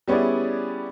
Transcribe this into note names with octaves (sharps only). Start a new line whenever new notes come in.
G3 B3 C#4 E4 G#4 D5